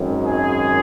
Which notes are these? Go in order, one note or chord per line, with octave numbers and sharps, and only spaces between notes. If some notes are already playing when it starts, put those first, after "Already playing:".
Already playing: G#1 F#2 D#3
G#4